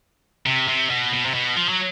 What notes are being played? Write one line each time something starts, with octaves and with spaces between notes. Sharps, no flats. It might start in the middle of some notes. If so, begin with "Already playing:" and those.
C3
C3
B2
B2
C3
B2
F3
F#3